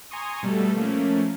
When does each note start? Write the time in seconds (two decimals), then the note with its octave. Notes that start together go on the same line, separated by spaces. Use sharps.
0.11 G#5 A#5 C6 C#6 D#6
0.43 B2 G3 A3 A4
0.75 F3 A3 A#3 C#4